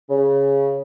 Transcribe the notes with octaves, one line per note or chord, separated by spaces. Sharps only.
C#3